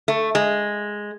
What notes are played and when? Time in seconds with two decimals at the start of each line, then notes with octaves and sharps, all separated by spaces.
0.08 A3
0.35 G#3